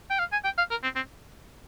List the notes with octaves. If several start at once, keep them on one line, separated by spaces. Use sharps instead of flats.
G5
F5
G#5
G5
F5
A#4
C4
C4